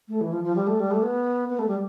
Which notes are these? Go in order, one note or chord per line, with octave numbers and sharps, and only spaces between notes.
A3
E3
F3
F3
G3
A3
G3
A3
B3
B3
A3
G3